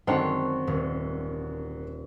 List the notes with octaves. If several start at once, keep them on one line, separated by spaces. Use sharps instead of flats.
F#2 D3 D#3 G#3 C4 D4 C5 C#5
D#1